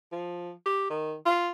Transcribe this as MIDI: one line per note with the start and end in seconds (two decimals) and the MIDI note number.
0.12 0.52 53
0.66 0.85 67
0.90 1.14 51
1.26 1.51 65